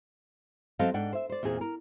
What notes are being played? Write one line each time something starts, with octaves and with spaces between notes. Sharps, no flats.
F#3 C4 A4 D#5 F5
G#2 D4 F#5 G5
C5 E5
C5 D5
E2 A#2 C4 G#4
A#4